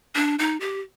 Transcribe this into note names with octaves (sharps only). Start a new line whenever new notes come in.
D4
D#4
G4